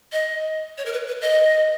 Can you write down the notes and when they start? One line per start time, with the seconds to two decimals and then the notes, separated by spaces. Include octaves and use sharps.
0.12 D#5
0.78 C#5
0.86 A#4
0.92 B4
1.07 B4
1.21 D#5